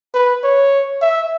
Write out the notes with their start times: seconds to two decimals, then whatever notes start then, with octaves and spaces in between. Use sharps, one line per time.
0.14 B4
0.44 C#5
1.02 E5